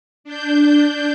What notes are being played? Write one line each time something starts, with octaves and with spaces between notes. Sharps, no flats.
D4 G6